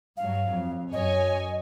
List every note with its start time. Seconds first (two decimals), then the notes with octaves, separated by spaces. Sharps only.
0.17 G2 F#3 F5
0.51 F2
0.92 F#2 C#5 D#5 G#5